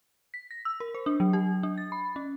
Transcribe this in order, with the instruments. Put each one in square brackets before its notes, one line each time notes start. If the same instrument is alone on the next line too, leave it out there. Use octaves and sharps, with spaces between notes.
[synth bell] B6
A#6
E6
A#4
C5
D4
F#3
G4
D4
A6
B5
C#4